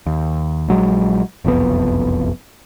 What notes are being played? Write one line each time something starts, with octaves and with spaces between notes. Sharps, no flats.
D#2
A#1 F#3 G#3
F#1 C2 F2 B3